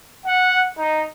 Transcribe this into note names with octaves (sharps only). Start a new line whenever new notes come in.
F#5
D#4